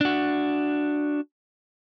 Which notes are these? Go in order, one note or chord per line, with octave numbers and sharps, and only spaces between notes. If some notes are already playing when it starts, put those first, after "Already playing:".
D4 F#4